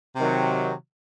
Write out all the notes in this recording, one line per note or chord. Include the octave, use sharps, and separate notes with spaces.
C3 D#3 F#3